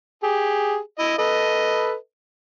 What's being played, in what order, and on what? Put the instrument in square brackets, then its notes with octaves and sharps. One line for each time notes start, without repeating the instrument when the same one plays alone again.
[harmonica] G4 G#4
E4 D#5
A4 B4 D#5